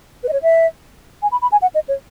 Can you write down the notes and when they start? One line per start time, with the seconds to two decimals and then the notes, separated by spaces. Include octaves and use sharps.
0.23 B4
0.29 D#5
0.33 C#5
0.43 E5
1.22 G#5
1.32 B5
1.42 B5
1.52 G#5
1.62 F#5
1.75 D#5
1.88 C#5